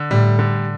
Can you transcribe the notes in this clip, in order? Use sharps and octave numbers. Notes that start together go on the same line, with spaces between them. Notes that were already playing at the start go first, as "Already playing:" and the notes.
Already playing: D3
A2 G3
D3